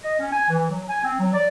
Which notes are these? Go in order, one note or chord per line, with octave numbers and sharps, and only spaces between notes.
D#5
C#4
G#5
E3
F#3
G#5
C4
F#3
D5